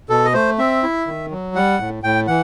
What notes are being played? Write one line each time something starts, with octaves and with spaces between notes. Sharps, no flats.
B2 A4
D#5
A3 C5
C4 E5
E4
D#3
F#3
G3 F#5
A2
A2 G5
E3 F#5